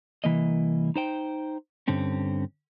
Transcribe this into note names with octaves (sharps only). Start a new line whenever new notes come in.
C2 E3 A#3 D#5
D#4 C5 G5
G2 D3 C4 C#4